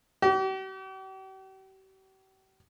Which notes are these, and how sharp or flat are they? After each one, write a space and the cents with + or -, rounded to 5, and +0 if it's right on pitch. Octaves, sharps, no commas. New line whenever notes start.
G4 -45